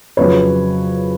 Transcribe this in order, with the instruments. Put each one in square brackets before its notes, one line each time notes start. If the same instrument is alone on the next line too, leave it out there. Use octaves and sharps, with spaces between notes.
[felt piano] F2 C#3 F#3 B4 C#5